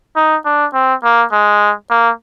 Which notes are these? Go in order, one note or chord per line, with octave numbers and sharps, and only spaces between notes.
D#4
D4
C4
A#3
G#3
A#3